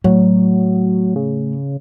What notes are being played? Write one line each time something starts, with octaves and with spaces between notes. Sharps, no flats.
A2 F#3
C#3